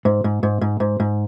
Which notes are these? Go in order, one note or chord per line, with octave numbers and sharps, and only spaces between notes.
G#2
G#2
G#2
G#2
G#2
G#2